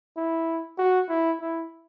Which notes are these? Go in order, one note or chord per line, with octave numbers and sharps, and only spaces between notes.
E4
F#4
E4
E4